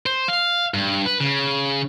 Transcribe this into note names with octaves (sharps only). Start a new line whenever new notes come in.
C5
F5
G2
B4
C#3